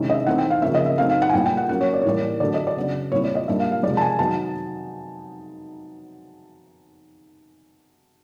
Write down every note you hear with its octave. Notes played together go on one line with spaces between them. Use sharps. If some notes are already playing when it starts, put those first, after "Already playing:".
Already playing: C3 D#3 G#3 C#4 E4
D#5
E5
E3 A3 C4 D#4 F#5
G5
F5
C#3 F3 A#3 C#4 E5
D#5
E5
F#3 A3 C4 D#4 F5
F5
F#5
G#5
A#2 G3 B3 E4 G5
G5
F#5
F#3 A#3 C#4 F#5
C#5
D5
C#5
A2 E3 G3 A#3 D5
D3 F#3 A3 D4 D5
D#5
D5
C#3 F#3 B3 D4
A#2 G3 C4 E4 C#5
D5
D#5
A#2 G3 A#3 D4 E5
F5
F5
C3 F3 G#3 D5
A5
G#5
D#3 F#3 B3 D#4 A5